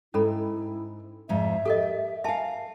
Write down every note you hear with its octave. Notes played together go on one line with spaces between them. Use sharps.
G#2 C#4 E4 A4 B5
F2 G#2 F3 E5
G4 A4 A#4 D#5
A#4 E5 F5 G#5 A5